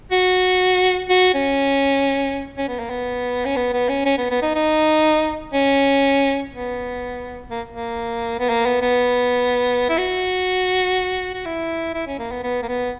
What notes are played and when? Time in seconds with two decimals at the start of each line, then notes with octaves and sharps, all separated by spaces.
0.12 F#4
1.10 F#4
1.34 C#4
2.58 C#4
2.68 B3
2.79 A#3
2.90 B3
3.45 C#4
3.56 B3
3.73 B3
3.89 C#4
4.05 C#4
4.18 B3
4.31 B3
4.42 D#4
4.55 D#4
5.53 C#4
6.52 B3
7.50 A#3
7.72 A#3
8.40 B3
8.50 A#3
8.66 B3
8.82 B3
9.90 E4
9.98 F#4
11.34 F#4
11.45 E4
11.94 E4
12.07 C#4
12.19 A#3
12.31 B3
12.44 B3
12.62 A#3
12.68 B3